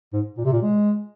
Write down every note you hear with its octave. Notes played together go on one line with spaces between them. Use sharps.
G#2
A#2
C3
A#2
G#3